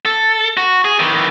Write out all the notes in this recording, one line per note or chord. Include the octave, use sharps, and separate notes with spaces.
A4
F#4
G#4
D#3 E3